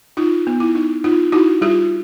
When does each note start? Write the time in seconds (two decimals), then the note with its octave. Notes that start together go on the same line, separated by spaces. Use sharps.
0.17 D#4 F4
0.47 B3
0.60 E4
0.75 D#4
1.04 D#4 F4
1.32 D#4 E4 F#4
1.61 G3 F4 G4